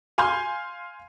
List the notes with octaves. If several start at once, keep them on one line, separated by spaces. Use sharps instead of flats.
F5 G#5 C6 F6 G6